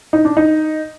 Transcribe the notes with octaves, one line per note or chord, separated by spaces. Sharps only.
D#4
D4
D#4